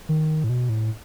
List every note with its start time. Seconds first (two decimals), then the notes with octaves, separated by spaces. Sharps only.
0.09 D#3
0.44 A2
0.49 B2
0.69 A2